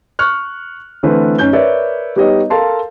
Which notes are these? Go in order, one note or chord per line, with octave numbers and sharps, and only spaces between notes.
C#6 F6 F#6
D3 E3 A3 C4 B4 C5
F#2 C#4 D#4 G6 G7
A#4 B4 C#5 D5 E5
G3 B3 D#4 G4 C#5 D#5
A4 A#4 F5 A5 C6